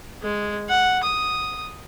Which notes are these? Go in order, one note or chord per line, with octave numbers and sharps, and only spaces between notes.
G#3
F#5
D#6